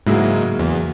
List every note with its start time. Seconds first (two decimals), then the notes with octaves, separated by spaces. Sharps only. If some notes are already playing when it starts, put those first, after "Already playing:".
0.07 G#2 C#3 F#3 A#3 E4 G#4
0.59 E2